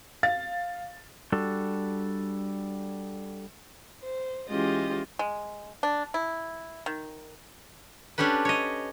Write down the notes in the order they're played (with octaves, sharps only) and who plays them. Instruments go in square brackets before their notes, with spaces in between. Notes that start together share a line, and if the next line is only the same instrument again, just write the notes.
[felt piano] F5 A6
[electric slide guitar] G3 D4 F#4 A4
[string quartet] C5
E3 G#3 C#4 F4 G4 D#5
[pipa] G#3
D4
E4
D#3
[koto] C#4 D4 G4 A4 B4
C#5 D#5